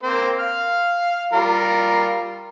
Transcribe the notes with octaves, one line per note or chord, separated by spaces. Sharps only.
A#3 C4 C5
F5 F6
G3 F4 A#4